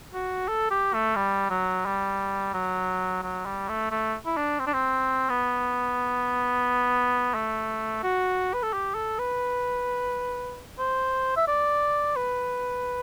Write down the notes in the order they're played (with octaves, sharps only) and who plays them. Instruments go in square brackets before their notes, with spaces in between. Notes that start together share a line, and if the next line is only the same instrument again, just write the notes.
[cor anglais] F#4
A4
G4
A3
G3
F#3
G3
F#3
F#3
G3
A3
A3
E4
D4
C4
D4
C4
B3
A3
F#4
B4
A4
G4
A4
B4
C5
E5
D5
B4